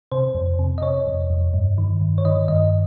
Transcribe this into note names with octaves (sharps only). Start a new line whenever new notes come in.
C3 C5
F2
C3
D#5
C3 C#5
F2
F2
G2
D#3
G2
C#5
D#3 D#5
G2 D#5